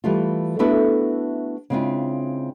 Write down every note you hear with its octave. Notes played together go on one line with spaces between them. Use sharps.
E3 G3 A3 F4
A3 B3 D4 E4 F#4 A4
C#3 G#3 C4 D4 E4 F4